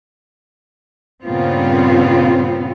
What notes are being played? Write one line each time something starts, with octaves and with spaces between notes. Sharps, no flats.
G2 A#2 C#3 B3 C4 F4